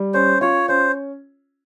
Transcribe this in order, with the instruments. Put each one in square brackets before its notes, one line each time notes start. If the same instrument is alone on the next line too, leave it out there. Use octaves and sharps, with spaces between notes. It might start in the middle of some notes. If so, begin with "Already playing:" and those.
Already playing: [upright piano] G3
[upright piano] C#4 [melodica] C5
[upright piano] F4 [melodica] C#5
[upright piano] C#4 [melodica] C5